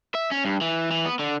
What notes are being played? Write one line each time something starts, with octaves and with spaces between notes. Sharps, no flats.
E5
C#4
G2
E3
E3
B3
D3